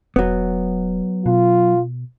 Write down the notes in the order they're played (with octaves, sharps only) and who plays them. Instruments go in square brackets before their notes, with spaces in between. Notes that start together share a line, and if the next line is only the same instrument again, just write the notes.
[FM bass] E1 [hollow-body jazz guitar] F#3 B3
[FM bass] B2 [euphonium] F4